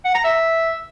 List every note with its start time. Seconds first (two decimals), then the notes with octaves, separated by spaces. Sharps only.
0.05 F#5
0.15 A#5
0.24 E5